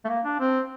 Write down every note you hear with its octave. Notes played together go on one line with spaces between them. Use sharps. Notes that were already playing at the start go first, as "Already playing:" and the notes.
A3
A#3
D4
C4